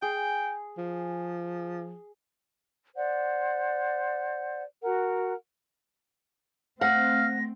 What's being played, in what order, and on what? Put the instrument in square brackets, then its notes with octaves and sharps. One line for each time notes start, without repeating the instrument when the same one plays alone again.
[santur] G#4 [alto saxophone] G5
[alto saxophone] F3
[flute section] C5 D5 F#5
F#4 A#4 F#5
[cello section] A3 C4 [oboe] F5 [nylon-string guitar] F#5 [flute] A#6